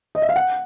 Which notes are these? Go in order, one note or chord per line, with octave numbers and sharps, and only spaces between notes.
D#5
E5
F5
F#5